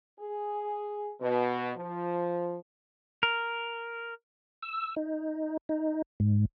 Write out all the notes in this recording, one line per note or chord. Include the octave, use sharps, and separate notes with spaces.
G#4
B2
F3
A#4
E6
D#4
D#4
G#2